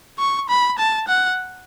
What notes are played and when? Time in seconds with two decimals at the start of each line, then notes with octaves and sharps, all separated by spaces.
0.19 C#6
0.49 B5
0.78 A5
1.08 F#5